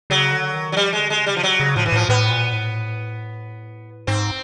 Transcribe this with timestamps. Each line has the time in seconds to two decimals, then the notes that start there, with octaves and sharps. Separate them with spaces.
0.10 C#3 F#3
0.32 D3
0.54 D#3
0.72 F#3
0.76 F3 G3
0.93 G#3
0.99 D3
1.10 G#3
1.21 C#3
1.26 G3
1.36 F3
1.43 F#3
1.60 C#3
1.76 A2 F3
1.86 E3
1.92 A2 F3
2.09 A2 B3
2.30 A#2
2.53 A2
4.07 G#2 C4